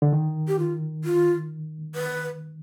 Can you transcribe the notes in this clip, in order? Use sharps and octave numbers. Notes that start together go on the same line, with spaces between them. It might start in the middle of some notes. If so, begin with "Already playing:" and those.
D3
D#3
G4
F4
F4
B4